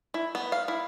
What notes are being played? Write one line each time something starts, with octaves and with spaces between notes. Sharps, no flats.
E4
B3
F5
E4